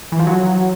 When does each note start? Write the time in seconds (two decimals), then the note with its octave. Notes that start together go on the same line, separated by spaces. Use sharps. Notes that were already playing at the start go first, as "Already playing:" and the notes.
0.12 E3
0.20 F3
0.27 F#3